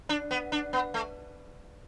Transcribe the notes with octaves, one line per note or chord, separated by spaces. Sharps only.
D4
B3
D4
B3
A3